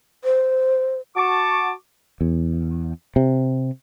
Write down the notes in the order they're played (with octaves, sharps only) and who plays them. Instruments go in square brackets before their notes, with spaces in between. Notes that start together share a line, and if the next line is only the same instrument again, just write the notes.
[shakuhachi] C5
[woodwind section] F#4 A5 C#6 D6
[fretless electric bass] E2
C3